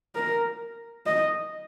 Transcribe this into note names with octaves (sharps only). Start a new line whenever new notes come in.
A#4
D#5